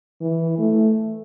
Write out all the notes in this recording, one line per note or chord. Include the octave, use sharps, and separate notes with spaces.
E3
A3